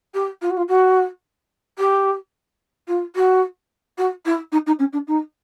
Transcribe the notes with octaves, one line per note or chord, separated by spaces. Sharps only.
G4
F4
F#4
F4
F#4
G4
F4
F#4
F#4
E4
D#4
D#4
C#4
D4
D#4